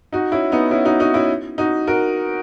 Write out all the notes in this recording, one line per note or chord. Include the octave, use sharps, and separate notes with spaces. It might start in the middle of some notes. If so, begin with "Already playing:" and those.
D#4 F#4
C#4 E4
B3 D#4
C#4 E4
D#4 F#4
D#4 F#4
C#4 E4
D#4 F#4
F#4 A#4